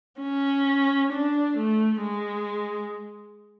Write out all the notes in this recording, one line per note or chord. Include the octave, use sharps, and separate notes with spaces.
C#4
D4
A3
G#3